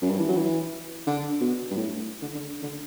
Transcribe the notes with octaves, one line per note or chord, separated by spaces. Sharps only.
F#2
G2
E3
F#3
E3
D3
B2
G2
A2
D3
D3
D3